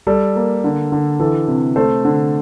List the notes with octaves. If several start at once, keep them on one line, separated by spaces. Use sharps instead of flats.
G3 A4
A#3
D3
D3
E3 A4
C3
A3 A4 C5
D3